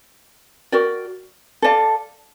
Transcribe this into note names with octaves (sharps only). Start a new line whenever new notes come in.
F#4 A#4 D5 G5
A4 D5 F5 A5